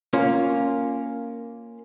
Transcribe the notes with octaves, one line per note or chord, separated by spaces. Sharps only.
A#3 C#4 F4